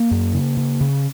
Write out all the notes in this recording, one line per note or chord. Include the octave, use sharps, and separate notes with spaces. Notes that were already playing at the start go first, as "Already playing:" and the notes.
Already playing: A#3
F#2
C#3
C#3
C#3